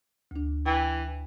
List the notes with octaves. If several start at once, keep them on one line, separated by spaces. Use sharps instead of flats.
D2 D4
E3 G5